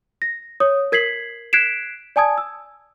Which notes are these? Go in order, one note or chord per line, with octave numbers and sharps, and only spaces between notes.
A#6
C#5 D#6
A#4 G#6 B6 C7 F#7
F#6 G#6 B6 C7 D7 E7
D5 G#5 A5 D#6 G#6
E6